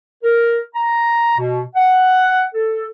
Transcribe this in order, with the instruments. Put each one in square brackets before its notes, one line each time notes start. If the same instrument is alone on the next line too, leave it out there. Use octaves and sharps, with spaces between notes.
[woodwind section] A#4
A#5
B2
F#5
A4